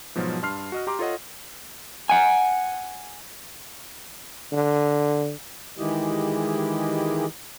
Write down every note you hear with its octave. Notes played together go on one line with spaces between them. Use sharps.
G#2 B2 F3 F#3
G2 A5 C6 F6 C7
F#4 D#5 F6
G4 A#5 C6 D6
F4 A4 C#5 D#5 F#5
F#5 G#5
D3
D#3 E3 G#3 E4 G4 D#5